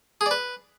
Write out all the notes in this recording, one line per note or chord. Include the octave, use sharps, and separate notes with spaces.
G#4
D5
B4